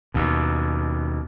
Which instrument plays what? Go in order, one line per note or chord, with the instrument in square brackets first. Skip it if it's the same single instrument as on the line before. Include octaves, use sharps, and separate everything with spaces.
[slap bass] D#2 B2